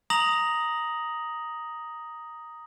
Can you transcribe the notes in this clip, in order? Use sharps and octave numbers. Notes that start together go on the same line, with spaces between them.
A#5 D#6 A#6 F7 F#7